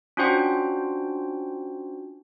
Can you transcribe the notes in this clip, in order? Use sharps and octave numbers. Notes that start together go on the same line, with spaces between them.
C#4 D4 F4 F#4 C5 G5